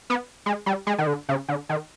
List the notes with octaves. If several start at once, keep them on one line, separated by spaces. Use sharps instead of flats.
B3
G#3
G3
G#3
D#3
D3
C#3
D3
D#3